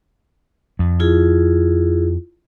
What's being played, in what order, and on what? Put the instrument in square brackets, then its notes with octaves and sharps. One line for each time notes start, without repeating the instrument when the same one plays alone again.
[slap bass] F2
[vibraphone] E4 F4 G#4